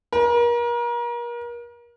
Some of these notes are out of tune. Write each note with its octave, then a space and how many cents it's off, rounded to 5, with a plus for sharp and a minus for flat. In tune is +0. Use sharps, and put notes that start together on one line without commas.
A#4 +35